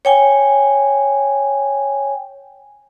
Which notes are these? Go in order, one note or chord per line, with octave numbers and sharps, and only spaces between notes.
C#5 G5 G#5